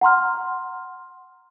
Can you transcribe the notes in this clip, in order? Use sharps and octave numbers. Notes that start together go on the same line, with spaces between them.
F#5 A#5 C6 F6